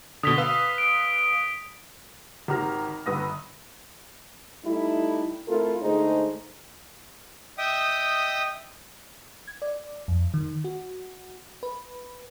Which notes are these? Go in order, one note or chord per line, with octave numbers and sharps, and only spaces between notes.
B2 D3 D#6 B6 G7
B4 F5 E6
D7
G#1 G4 A#5 F6 A#6
G1 G2 B4 D#6 E6 A#6
G3 A3 D#4 E4
A3 C4 E4 F4 A4 A#4
D3 G#3 A3 D#4 G#4 C5
D#5 E5 G5 D#6
G#6
D5
F2
D#3
F#4
B4